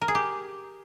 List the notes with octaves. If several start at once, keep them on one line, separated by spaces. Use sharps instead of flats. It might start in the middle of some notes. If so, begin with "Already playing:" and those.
A#4
G#4
G4